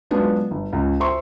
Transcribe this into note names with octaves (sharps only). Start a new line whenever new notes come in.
F#3 G#3 B3 D4 F4
G1
C#2
C5 E5 C6 C#6